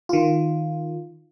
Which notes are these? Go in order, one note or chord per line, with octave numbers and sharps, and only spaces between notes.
D#3 F4